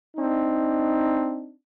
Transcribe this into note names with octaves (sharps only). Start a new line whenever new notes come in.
C4 D4 D#4